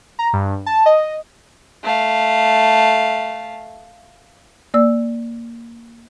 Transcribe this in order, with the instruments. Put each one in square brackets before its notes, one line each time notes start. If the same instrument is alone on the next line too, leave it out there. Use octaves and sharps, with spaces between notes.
[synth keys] A#5
G2
A5
D#5
[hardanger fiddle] A3 F5
[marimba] A#3 D5 E6